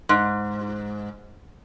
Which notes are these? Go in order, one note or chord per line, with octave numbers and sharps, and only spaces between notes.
G#2